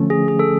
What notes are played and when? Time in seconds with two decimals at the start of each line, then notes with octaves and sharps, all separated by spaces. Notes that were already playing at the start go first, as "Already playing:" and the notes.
Already playing: D3 F3 A3 C#4
0.10 G#4
0.28 G#4
0.39 A4